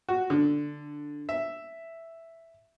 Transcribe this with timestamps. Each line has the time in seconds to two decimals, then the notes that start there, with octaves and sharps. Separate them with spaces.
0.09 F#4
0.30 D3
1.29 E5